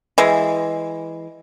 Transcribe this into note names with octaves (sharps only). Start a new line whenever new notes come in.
E3 G#3